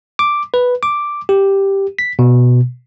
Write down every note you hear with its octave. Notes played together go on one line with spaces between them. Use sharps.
D6
B4
D6
G4
B6
B2